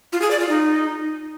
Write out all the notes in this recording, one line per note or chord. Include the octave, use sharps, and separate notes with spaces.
F4
G#4
D5
F4
D#4